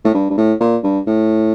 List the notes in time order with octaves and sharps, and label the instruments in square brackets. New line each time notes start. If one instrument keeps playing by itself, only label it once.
[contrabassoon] A2
G2
G2
A2
A#2
G2
A2